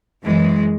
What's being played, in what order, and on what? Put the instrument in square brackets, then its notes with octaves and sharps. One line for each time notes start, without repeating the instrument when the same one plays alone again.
[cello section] F#2 E3 G#3